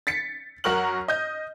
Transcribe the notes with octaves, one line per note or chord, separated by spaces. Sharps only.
A6 B6 C#7
F#2 F#4 A#4 C#6 F6 F#7
D#5 G6